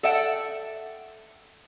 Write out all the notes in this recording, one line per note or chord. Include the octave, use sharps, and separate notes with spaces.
A4 D5 E5 F#5 G5